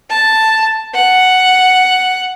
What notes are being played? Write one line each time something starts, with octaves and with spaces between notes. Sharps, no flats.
A5
F#5